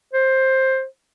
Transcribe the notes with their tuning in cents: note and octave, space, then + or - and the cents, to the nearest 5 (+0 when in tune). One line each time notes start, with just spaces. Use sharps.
C5 +15